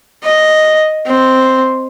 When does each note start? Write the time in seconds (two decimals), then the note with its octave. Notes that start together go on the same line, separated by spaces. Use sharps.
0.24 D#5
1.06 C4